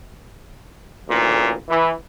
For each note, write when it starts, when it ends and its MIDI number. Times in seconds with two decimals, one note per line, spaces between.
1.08 1.53 33
1.08 1.53 38
1.08 1.53 46
1.69 1.92 52